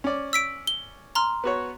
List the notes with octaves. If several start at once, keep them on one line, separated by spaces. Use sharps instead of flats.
C#4 D5
E6 B6 D7
G7
A#5 C6 F6
B3 F#4 C#5